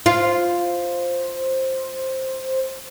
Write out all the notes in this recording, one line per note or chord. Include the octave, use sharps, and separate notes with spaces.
F4 C5